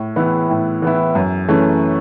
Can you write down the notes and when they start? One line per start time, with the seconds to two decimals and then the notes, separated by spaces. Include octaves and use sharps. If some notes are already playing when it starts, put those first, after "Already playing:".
Already playing: A2
0.16 E3 B3 E4
0.49 A2
0.82 E3 B3 E4
1.15 F#2
1.48 E3 A3 C#4